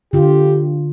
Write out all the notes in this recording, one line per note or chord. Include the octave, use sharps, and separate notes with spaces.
D3 F4 G4